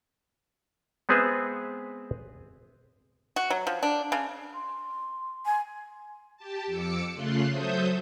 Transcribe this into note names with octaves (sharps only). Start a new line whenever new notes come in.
G#3 B3 C4 G#4 B4 E5
F#4
F#3
F3
D4
C#3
C6
G#5
G4 A5
F2 D6 E6 C#7
C#3 A3 F4 C6 F#6
F#3 A4 C5 E5 D#6 G6